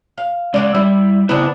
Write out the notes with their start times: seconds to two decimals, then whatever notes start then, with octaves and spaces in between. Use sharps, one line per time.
0.18 F5
0.54 G#3 C#4 D5 F5 F#5
0.75 G3 E4
1.29 C#3 B3 C4 D4 E4